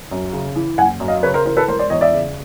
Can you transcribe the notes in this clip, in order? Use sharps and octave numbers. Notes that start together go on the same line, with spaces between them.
F#2
C#3
E3
F#1 F#5 G#5
F#2
D#5 F5
C#3 B4 C#5
A#4 C5
E3 A#4 C5
A4 B4
E1 A#4 C5
C5 D5
E2 C#5 D#5
D5 E5
C#3